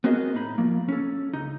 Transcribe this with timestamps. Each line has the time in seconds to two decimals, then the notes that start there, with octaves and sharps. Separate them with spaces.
0.04 B3 C4 F#4 G#4 A#4 D#5
0.35 A2 D#4 B5
0.58 F3 A3 A#3
0.89 C#4 A4
1.33 C#2 D#4